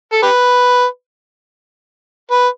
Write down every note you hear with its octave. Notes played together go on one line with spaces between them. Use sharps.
A4
G4 B4
B4